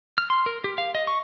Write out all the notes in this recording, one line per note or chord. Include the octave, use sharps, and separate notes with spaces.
F6
C6
A#4
G4
F5
D#5
C#6